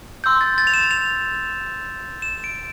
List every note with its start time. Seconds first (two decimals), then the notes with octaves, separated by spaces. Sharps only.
0.24 C6 E6 G6
0.41 A6
0.58 A6
0.67 F7
0.74 E7
0.91 F7
2.22 E7
2.44 D7